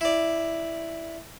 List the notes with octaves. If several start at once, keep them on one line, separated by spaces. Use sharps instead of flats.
E4 D5